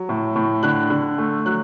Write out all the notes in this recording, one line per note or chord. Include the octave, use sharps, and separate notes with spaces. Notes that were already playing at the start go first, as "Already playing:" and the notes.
Already playing: F#3
A2
A2
D3 F#6
D3
A3
F#3 F#6